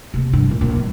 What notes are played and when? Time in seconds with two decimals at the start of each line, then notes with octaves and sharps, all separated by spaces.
0.14 C3 A#3
0.33 G2 F3
0.49 D2 A#2
0.61 A#1 A#2
0.76 E2 G3